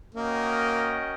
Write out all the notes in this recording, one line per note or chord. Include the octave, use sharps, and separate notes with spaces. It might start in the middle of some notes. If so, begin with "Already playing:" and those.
A#3 C#4 F#4 A#4 D#5 G5